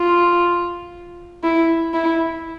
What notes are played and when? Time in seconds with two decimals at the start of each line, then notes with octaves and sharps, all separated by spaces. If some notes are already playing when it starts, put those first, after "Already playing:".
Already playing: F4
1.44 E4
1.93 E4